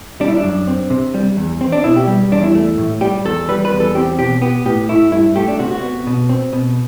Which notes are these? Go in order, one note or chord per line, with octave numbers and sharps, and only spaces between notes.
G3 D4
E4
D4
F#2
C4
C3
G3
E2
C4
D4
B2 E4
G4
G3
E2 D4
E4
A3
A2
G3 G4
E2 A4
G3 B4
B4
E2
A4
C4 G4
B2 G4
B3 G4
A2 G4
A3 E4
G2 E4
A3 G4
D4
C3 F#4
F#4
B3
B2
C4
B2